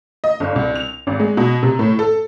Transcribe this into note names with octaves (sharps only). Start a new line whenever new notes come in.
D#5
G1
C2
F7
G#1
G#3
B2
C3
A2
A4